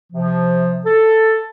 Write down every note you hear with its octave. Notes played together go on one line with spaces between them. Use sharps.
C3 F3
A4